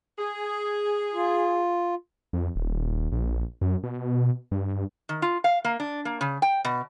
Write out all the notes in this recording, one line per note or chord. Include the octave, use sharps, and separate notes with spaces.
G#4
F4
F2
D#1
A#1
F#2
B2
G2
D#3
F4
F5
A#3
D4
A#3
C#3
G5
B2